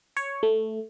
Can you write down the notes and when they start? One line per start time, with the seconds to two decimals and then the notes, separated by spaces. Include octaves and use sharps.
0.17 C#5
0.43 A3